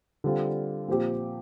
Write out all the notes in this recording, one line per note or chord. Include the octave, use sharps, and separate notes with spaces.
D3 G3 C4 F4
A#2 F3 C4 G4